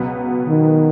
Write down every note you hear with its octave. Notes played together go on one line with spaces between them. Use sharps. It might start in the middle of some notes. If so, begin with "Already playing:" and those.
Already playing: C#2 B2 F#3 B3
D#3